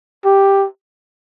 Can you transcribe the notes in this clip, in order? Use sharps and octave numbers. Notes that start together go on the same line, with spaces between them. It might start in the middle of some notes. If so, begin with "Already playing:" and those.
G4